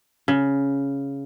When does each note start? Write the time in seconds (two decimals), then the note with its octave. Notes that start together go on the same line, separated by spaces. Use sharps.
0.28 C#3